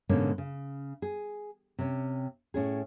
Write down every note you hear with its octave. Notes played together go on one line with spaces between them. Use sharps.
G#2 B2 D3 G#3 A#3 C#4
C#3
G#4
C3 C#4
A2 C#4 G#4